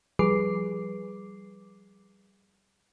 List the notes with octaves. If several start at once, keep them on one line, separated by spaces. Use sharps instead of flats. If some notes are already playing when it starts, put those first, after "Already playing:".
F3 G3 G#4 B4 D6 C7